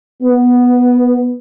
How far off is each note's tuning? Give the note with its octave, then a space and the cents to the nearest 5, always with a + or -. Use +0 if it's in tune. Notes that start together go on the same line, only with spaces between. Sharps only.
B3 -5